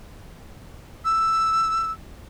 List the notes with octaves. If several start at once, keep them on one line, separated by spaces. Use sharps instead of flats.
E6